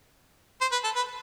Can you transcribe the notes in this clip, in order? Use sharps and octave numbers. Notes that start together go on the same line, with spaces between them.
C5
B4
A4
B4